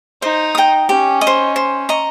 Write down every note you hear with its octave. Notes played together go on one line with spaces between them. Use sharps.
D#4 C5
G5 A#5 D#6
C#4 G4
D#5
C5
C5
D#5 A#5 C#6